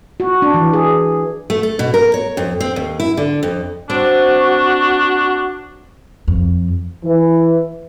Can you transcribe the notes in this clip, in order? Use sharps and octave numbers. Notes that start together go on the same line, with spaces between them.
F#4
D4
E3
G#4
A3
A4
B2
A#4
C#5
F2
C4
D#2
E4
D3
F2
C4 D4 F#4
F2
E3